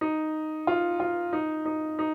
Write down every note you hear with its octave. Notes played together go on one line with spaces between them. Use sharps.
D#4
F4
F4
D#4
D#4
D#4